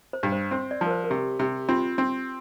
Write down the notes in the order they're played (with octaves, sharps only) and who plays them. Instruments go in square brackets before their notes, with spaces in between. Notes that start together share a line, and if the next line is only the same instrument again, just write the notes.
[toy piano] C5
[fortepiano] G2
[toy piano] C5
[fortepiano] C4 [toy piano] C5
[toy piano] D5
[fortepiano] F3
[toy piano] A#4
C5
A#4
[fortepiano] C3 [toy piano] G4
[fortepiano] C3
[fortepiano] C4 [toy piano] F4
[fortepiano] C4